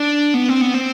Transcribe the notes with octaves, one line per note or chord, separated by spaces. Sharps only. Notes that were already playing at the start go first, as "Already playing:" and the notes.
Already playing: D4
B3
C4
B3
C4